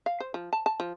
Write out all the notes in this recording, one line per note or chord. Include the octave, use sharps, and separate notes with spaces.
F5
C5
F3
A5
A5
F3